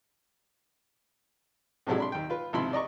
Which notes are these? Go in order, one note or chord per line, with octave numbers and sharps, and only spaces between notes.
A2 C3 F3 F#3 G#3 E4
D4 B5 C6
D#2 G5
F4 B4
G#1 C3 F3 E4 B5 C6
D5 D#5 A#5 C#6